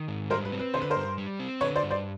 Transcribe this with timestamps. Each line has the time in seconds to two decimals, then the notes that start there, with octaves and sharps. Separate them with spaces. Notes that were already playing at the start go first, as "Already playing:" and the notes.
Already playing: D#3
0.08 G#2
0.30 G3 A#4 C5
0.45 B4
0.52 C4
0.59 B4
0.74 D3 C5
0.82 B4
0.90 A#4 C5
0.96 G2
1.18 G3
1.40 C4
1.61 D3 B4 C#5
1.76 C5 D5
1.83 G2
1.91 C5 D5